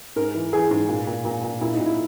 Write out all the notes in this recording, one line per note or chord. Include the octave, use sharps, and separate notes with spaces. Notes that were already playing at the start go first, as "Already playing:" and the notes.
G#2 A#4
E3
E3 G#4
G#2
A#2
A#2
A#2
A#2
A#2 E4
D#4
A#2
E4